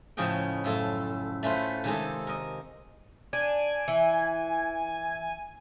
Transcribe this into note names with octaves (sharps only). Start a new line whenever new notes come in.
A2 C#3 F3 G#4 D#5 G5
F#2 A2 F4 A4
A3 C#4 F4 B4 C5
C3 D#3 G#3 D#4 G#4 A4
A#4 D#5
D4 G#5
E3